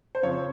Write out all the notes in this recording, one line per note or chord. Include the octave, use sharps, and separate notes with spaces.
C5
F2 C#3 F3 C#5